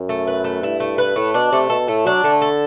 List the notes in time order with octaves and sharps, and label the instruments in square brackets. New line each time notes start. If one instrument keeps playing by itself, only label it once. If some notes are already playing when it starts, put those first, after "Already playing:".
Already playing: [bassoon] F#2
[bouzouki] A3
B4
A3
[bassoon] G2 [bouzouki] E4
[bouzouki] A3
B4
[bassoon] A2 [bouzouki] A3
[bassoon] B2 [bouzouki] D4
[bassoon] C3 [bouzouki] A3
[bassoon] B2 [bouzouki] A4
[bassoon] A2 [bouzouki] A3
[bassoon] F#3 [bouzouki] D4
[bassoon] D3 [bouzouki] A3
[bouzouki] A4